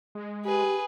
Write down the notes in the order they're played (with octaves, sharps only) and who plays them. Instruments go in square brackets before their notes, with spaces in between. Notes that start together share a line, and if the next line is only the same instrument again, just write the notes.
[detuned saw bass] G#3
[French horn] G4 [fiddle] G#4 B4